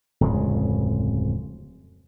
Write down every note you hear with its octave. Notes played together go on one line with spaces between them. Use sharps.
D1 F2 C#3 G#3